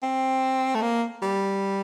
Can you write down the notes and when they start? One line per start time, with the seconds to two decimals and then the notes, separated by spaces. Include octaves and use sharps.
0.03 C4
0.75 A3
0.81 A#3
1.22 G3